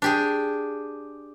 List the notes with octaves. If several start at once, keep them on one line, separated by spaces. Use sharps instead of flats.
D4 G4 G#4